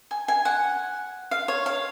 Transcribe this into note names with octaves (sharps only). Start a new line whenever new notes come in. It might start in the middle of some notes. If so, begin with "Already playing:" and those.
G#5
G#5
F#5
F5
C#5
F5